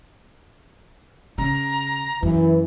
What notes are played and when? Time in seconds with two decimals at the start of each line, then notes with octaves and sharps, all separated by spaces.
1.38 C#3 A#5
2.23 F#2 E3